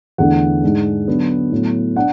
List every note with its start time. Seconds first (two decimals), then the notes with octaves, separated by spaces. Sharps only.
0.18 E2 D3 A3 D4 F#5
0.63 G#2 G#3 D4
1.07 D3 F#3 B3 D4
1.52 A2 F#3 B3
1.96 D4 F#5